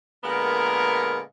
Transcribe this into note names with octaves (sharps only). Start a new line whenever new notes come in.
A#2 D3 G#3 B3 A#4